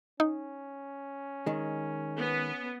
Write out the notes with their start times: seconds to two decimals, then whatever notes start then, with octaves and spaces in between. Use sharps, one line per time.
0.20 C#4 D#4
1.46 D#3 G#3
2.18 B3